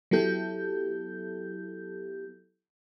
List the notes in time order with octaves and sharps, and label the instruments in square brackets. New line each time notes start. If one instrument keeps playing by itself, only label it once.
[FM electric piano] F#3 B3 E4 G4 A4 G6